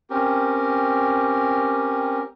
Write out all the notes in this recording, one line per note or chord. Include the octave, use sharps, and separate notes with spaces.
C4 C#4 G4 A#4